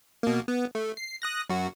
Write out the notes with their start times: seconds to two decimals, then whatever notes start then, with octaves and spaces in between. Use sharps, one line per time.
0.23 B2 A#3
0.48 B3
0.75 A3
0.97 C7
1.22 D#6 F#6 A#6
1.50 F#2 F#4